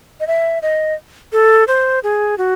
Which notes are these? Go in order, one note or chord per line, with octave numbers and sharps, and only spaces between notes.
D#5
E5
D#5
A4
C5
G#4
F#4